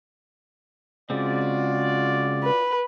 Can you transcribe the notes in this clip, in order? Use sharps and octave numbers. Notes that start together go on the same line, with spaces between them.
C#3 G#3 C4 F4 F#4 D5
B4